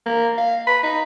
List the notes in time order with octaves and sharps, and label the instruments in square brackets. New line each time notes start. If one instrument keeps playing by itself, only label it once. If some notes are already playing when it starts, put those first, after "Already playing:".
[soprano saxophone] A#3
F5
B5
D#4